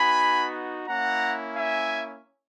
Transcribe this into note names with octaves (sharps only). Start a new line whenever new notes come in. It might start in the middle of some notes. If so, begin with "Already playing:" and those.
Already playing: B3 D#4 F#4 G#5 B5
A#3 C#4 E4 F#5 A#5
E5 G#5